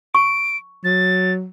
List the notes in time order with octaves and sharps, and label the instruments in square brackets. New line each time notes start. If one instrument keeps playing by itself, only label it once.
[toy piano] C#6 [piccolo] D7
[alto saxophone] F#3 [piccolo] A6